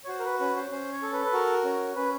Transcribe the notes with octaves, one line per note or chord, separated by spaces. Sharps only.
C#5
F#4 C5
A#4
B4
C#4 B4
C5
C#4 C5
C#5
A4
B4
B4
F#4 A#4
C#4
C#4 B4